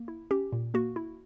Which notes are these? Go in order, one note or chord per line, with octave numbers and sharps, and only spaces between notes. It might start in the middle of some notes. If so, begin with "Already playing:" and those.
Already playing: A#3
E4
C#4 G4
A#2
A#3 F#4
E4